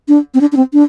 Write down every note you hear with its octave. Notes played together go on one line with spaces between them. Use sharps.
D4
C4
D4
D4
C4
D4